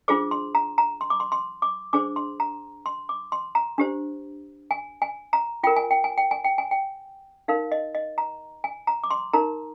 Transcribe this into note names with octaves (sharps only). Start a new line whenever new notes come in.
D4 F4 G#4 C5 D6
C6
A#5
A#5
C6
D6
C6
C6
D6
D4 G#4 C5 D6
C6
A#5
C6
D6
C6
A#5
D4 G4 C5
G#5
G#5
A#5
F4 A#4 G5
G#5
G5
G#5
G5
G#5
G5
G#5
G5
D#4 A#4 F5
D#5
D#5
A#5
G#5
A#5
D6
C6
D#4 A#4 A#5